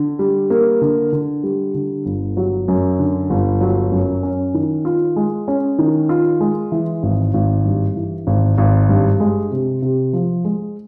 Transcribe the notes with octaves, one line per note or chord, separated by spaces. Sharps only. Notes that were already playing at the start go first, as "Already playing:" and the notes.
Already playing: D3
G3
A#3
D3
D3
G3
D3
G1
F#3
F#2
D3
G1
F#3
F#2
C#4
D#3
F4
G#3
C#4
D#3
F4
G#3
E3
G#1
G#1
G2
E3
G#1
G#1
G2
G#3
C3
C3
F3
G#3